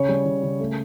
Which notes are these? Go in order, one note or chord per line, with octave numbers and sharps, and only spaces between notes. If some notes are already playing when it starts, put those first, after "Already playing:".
Already playing: C#3 C#5
G3
C#3
C#3
A3